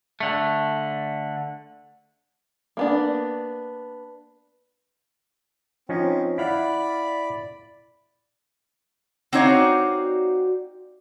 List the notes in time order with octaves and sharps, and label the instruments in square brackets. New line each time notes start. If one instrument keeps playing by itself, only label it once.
[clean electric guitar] D3 A3
[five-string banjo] A#3 B3 D4
[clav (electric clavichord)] F3 C#4 D#4 [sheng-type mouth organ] C4
[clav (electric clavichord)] E4 F5 F#5 [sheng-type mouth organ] D5 B5
[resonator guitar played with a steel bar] C4 D#4 C#5 [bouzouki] F#4 D5 F5